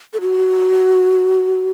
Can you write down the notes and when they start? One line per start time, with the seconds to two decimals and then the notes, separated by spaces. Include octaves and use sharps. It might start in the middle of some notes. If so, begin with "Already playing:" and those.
0.14 A4
0.21 F#4